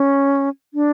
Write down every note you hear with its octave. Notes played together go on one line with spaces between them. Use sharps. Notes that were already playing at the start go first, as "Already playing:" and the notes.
Already playing: C#4
D4